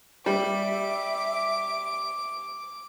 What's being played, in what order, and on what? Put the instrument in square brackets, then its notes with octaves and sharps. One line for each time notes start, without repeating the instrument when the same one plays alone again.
[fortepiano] G3 [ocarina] E5 [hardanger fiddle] D6